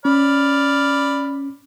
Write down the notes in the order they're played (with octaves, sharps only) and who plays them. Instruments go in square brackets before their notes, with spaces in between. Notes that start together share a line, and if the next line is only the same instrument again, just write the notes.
[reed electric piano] C#4 [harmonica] D5 B5 F6